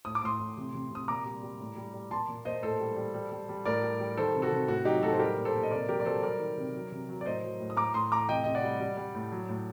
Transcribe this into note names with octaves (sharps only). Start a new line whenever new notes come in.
A2 D#6
D6
A2 C6 D#6
A2
C3
C3
C3 D#6
A#2 A#5 D6
G3
G3
A2
G3
G3
A#2 A5 C6
A#2
A#2 C5 D#5
A2 A4 C5
G3
G3
G3
G3
G3
A2 A#4 D5
G3
G3
D#3 A4 C5
C3
F#4 A4
C3
A2 F#4
F#3 D#4 G4
A2 F#4 A4
C5
G3 G4 A#4
A#2
A4 C5
A#2
D#5
C3 A#4 D5
F#3 G4 A#4
D5
F#3 A4 C5
G3 A#4 D5
D#3
C3
F#3
C3
F#3
D5
A2 C5 D#5
F#3
A2
D#6
A2 A#5 D6
A2 C6 D#6
A2 A#5 D6
C3 D#5 G5
C3 D#5
D5 F#5
G3
G3
G3
A2
F#3
A2